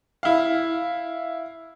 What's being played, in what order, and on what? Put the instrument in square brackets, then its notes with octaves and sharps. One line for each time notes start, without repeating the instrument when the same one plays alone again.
[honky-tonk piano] E4 F5